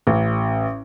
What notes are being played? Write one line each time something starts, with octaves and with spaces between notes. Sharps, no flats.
A1